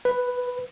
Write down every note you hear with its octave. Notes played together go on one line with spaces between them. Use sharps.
B4